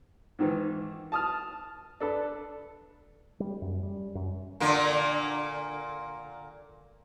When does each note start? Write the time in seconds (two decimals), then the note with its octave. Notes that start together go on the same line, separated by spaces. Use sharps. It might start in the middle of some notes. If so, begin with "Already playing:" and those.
0.39 G#2 D#3 E3
1.12 A5 D#6 F6
2.00 D4 A4 B4
3.40 G3
3.62 F#2
3.83 G3
4.15 F#2
4.60 A#2 D3 A#3